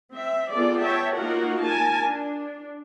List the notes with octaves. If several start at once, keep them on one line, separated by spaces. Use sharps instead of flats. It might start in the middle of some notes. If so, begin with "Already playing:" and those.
C4 E5
B3 F4 G#4 A4 D5
C#5 E5 G5 A5
A#3 D#4 F4 F#4 A#4 F#5
A#4 G#5 A5
D4